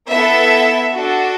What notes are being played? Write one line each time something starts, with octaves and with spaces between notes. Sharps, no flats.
B3 E4 A4 E5
D4 F#4 A4